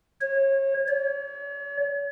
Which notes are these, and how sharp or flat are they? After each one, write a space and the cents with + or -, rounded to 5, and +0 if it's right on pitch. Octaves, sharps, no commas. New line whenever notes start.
C#5 -30
C#5 +40